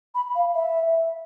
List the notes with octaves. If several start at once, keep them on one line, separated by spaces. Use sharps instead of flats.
B5
F5
E5